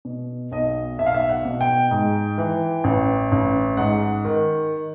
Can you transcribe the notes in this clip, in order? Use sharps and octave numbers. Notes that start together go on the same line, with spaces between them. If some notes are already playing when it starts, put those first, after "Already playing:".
B2
B1 D#5
B1 E5
F5
E5
F#5
B2
G5
G#2
E3
A1
A1
G#2 F#5
D#3